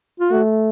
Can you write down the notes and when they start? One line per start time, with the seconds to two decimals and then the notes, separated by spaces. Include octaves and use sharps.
0.20 F4
0.31 A3 F#4